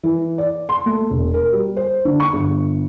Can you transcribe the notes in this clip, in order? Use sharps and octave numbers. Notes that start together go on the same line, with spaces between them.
E3
D5
C6
A3
E1
A#4
G3
C5
D3
C#6
G1